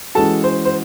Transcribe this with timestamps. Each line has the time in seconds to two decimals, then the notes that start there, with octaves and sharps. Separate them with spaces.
0.15 E3 G#3 C#4 F#4 A4 A5
0.44 C5
0.65 C5